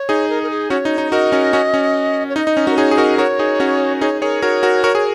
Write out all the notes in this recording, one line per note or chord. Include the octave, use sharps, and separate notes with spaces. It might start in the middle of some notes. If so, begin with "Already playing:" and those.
Already playing: C#5
D#4 G#4
A#4
A#4
G#4
C#4 F#4 C#5
D#4
D#4
F#4 A#4 D#5
C#4 F#4
C#4 F#4
C#4
C#5
D#4 D#5
D#4
C#4
C#4 F#4
A#4
D#4 G#4 C#5
G#4
F#4 A#4 D#5
F#4 A#4 C#5
D#4 G#4
C#4 F#4
D#4 G#4 C#5
G#4 A#4 C#5
F#4 A#4 C#5
F#4 A#4
F#4 A#4 C#5
G#4